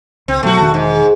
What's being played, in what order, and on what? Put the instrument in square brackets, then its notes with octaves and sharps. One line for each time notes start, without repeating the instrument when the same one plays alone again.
[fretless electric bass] C#2 [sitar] C4
[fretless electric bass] B2 F#3 [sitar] A3 F#4
[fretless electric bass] E1 D#3 D4
[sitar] G#2